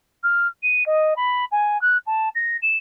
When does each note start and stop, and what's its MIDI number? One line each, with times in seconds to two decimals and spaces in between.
0.23 0.47 89
0.63 0.83 99
0.86 1.14 75
1.16 1.45 83
1.51 1.80 80
1.81 1.97 90
2.06 2.29 81
2.35 2.57 94
2.62 2.77 100